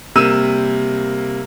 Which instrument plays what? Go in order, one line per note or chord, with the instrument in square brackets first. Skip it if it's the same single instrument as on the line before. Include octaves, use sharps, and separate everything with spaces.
[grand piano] C3 G3 A#3 E6 D#7 E7